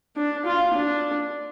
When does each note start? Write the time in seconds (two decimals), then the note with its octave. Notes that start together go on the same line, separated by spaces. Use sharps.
0.17 D4
0.46 F4
0.73 D4